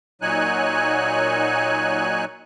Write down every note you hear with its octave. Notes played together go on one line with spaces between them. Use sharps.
A#2 F#3 D#4 C#5 G#5 F#6